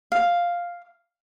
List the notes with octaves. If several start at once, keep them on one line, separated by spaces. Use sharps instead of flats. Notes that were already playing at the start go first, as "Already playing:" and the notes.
F5